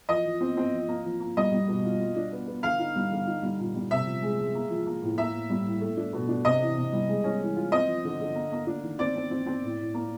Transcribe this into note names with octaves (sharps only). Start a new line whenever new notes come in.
F3 D#5
F3
C4
C4
F3
A#3
F3
A#3
G3 D#5
G3
B2
F4
F4
D4
B3
B3
D3 F5
D#4
G3
D3
D#4
G3
A#2
G3
C3 E5
F3
G#3
G#3
A#3
F3
A#3
A2
A#3 E5
A2
G3
A2
A3
D4
B2
D4
C3 D#5
E3
C3
G3
G#3
C#4
E3
F4
C4 D#5
F3
D3
D3
A#3
A#3
D4
D#3
C4 D5
C4
C4
C4
A2
A2
A#3